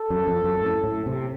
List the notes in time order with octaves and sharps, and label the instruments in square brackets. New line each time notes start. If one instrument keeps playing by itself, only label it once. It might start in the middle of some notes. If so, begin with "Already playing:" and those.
Already playing: [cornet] A4
[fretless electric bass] F#2
F2
F#2
A2
A2
C3